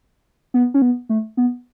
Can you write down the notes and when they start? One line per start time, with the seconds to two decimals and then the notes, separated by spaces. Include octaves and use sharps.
0.54 B3
0.74 C#4
0.82 B3
1.09 A3
1.37 B3